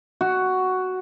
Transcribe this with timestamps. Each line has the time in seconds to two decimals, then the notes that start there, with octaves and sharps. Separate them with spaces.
0.21 F#4